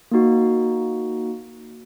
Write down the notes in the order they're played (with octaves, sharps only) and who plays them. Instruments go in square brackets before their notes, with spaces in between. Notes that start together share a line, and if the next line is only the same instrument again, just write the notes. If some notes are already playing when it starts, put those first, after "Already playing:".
[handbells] A#3 D#4 F#4